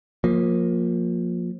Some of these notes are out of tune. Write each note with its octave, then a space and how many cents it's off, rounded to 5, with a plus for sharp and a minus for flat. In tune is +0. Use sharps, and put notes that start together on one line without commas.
F3 +25 A#3 +0